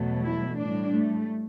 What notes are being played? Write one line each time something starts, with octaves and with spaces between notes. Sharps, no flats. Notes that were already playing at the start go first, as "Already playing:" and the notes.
Already playing: E2 B2 F#3 A3
E4
A2 G3 D4
A3